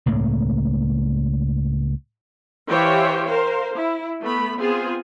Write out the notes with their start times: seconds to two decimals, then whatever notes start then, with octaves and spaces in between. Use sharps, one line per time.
0.06 C#2 A2 A#3
2.67 E3 G4 C5 C#5 F5 G5
3.25 A#4 C5 F5
3.74 E4
4.21 A3 B3 B5
4.59 B3 C4 F4 G#4